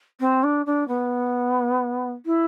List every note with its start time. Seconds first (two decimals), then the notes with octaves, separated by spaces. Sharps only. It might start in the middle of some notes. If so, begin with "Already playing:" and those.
0.20 C4
0.44 D4
0.66 D4
0.88 B3
2.26 E4